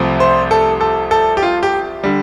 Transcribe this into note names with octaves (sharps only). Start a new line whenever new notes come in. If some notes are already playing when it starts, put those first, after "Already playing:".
Already playing: C2 C3 F3 A3
C5
A4
A4
A4
G4
F4
G4
D3 G3